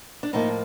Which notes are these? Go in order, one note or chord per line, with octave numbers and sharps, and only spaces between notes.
D4
A2 F3 A#3 D#4